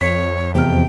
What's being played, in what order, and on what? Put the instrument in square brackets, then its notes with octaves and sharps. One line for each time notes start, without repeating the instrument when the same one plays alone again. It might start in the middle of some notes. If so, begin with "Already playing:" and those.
[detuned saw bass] F2 [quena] C#5 [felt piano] B6
[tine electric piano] E2 [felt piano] C3 F6 [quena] G5